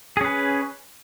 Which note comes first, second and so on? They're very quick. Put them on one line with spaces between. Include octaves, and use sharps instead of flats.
G#4 C#4 B4